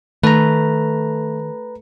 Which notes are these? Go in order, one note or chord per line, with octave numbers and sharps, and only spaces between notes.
D#3 A3 B4 A#5